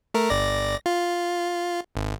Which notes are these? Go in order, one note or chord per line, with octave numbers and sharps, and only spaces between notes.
A3 A#4
G1 D5 A#6
F4
G#1